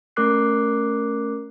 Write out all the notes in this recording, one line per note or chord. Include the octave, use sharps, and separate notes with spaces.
A3 C#4 A#4 D6 F#6 C7